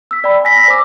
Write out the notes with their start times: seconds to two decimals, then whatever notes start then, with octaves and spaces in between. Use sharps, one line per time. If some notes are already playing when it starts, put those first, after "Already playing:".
0.11 E6 B6
0.24 D5 G5 B5
0.44 G#5 A#6 B6
0.56 E6 A#6 B6
0.68 C5 D6